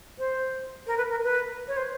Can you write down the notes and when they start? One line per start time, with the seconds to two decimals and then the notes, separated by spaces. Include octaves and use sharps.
0.19 C5
0.87 A#4
0.98 B4
1.11 A#4
1.24 B4
1.68 C#5
1.77 C5